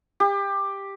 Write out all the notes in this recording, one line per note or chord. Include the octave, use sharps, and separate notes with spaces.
G4